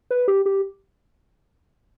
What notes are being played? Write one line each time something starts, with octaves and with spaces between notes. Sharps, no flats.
B4
G4
G4